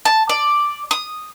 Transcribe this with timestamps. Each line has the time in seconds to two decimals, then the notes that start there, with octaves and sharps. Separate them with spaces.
0.05 A5
0.29 D5
0.91 D#6